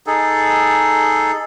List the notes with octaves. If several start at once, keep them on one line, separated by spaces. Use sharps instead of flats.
D#4 G#4 A4